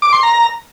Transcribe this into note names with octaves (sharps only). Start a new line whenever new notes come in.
D6
C6
A#5